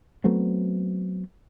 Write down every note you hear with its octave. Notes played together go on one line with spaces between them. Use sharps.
F#3 A3 B3 C4